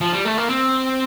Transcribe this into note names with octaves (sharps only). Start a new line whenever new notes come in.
F3
G3
A3
A#3
C4